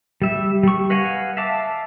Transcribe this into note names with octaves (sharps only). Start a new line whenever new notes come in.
G3 E5
G3 C#6
B4 D#5 F5 F#5 G#5
E5 F5 A5 D6